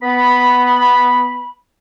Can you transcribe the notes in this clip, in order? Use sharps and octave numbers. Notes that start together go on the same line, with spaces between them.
B3 B5